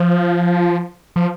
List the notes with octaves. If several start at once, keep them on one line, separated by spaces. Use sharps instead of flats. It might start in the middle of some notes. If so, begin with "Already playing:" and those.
Already playing: F3
F3